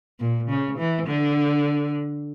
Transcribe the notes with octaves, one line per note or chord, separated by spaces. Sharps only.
A#2
C#3
E3
D3